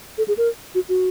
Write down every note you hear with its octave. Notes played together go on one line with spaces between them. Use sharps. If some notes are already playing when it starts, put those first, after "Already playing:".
A4
G#4
A#4
F#4
F#4